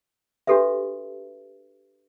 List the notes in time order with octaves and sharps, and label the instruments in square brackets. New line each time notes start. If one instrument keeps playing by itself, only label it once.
[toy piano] D4 F#4 G4 A4 B4 E5